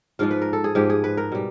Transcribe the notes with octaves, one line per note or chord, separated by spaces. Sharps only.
G#2 F3 G#3 F4
B4
A#4
A4
G#4
G#2 F3 G#3 G4
G#4
B4
A#4
B2 G3